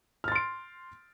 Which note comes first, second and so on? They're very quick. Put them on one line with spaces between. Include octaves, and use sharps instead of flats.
F6 A6 C6 D7